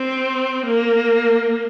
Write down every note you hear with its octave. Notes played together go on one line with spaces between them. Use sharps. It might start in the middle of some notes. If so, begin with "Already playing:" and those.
Already playing: C4
A#3